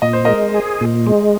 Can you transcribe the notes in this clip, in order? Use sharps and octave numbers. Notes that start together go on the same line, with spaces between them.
A#2 D#5
C5
G#3 A#4 D#5
G#4
A#2
G#3